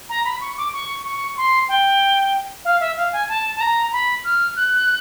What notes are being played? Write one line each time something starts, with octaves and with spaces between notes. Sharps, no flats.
A#5
B5
C#6
D6
C#6
C#6
C6
G5
F5
E5
F5
G#5
A5
A5
A#5
B5
F6
F#6